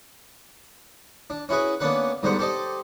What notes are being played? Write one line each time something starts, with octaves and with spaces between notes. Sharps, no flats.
D4
C#4 E4 F#4 G#4 B4
A#3 B3 C#4 D4 B4 F#5
G#2 D3 G3 B3 C5 F#5
G4 A4 C5 D5 D#5